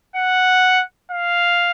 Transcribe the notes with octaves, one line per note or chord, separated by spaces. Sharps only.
F#5
F5